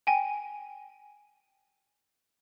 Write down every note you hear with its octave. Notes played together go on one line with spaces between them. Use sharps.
G5 G#5